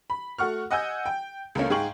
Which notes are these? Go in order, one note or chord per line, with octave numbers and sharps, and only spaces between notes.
B5
A3 F#4 F#5 C#6 F6
D#5 F#5 G#5 E6 G6
G5
C#2 A3 A#3 C#4
G#2 G#4 F5 G5 C#6 F#7